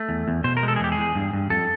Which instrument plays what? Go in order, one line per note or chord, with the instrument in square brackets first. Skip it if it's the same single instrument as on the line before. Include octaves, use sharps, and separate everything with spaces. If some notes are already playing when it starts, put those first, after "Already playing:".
Already playing: [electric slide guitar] A3
E2
E2
B2 C5
A#4
G#3
A4
G#4
E2 G4
G#4
E2
G2
G2
F2 A4